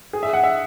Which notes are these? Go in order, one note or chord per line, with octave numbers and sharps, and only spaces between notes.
G#4
E5
F#5
E5